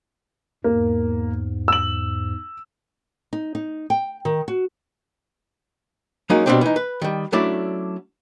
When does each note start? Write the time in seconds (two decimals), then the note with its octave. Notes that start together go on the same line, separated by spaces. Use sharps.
0.64 E2 G#2 A#3
1.68 E6 F#7
3.33 D#4
3.55 D#4
3.90 G5
4.25 D#3
4.48 F#4
6.30 F#3 G#3 A#3 C#4 D#4
6.46 B2 D3 G3 C4 D4 G5
6.61 E3 D#4
6.76 B4
7.02 D#3 G3
7.33 F#3 A3 C#4 D4 E4 D5